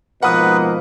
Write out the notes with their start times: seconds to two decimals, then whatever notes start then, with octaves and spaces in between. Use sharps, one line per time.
0.22 G#2 B2 F3 A#3 B4 F#5 D#6